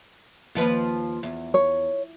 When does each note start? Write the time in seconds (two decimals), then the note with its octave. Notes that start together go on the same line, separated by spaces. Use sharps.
0.55 D#2 F3 B4
1.23 E2
1.54 C#5